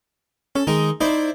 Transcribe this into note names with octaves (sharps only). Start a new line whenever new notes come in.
C#4 A4
D#3 G#3 D#4 A#4
D#4 E4 C5 D5